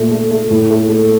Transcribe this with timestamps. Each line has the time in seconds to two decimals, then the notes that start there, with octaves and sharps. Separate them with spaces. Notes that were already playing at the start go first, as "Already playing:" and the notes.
Already playing: A#2 A3
0.11 A3
0.31 A3
0.50 A2
0.70 A3
0.89 A3